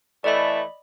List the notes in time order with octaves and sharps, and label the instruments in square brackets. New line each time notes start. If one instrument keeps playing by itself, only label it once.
[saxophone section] E3 A3 [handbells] D5 D#5 B5